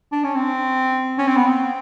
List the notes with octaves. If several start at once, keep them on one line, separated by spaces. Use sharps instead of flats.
D4
C#4
C4
C#4
C4
B3
C4